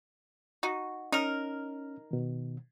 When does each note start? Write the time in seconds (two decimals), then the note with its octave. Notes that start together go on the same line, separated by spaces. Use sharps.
0.63 D#4 F#4
1.12 C#4 D#4 A#4 F6
2.11 B2 D#3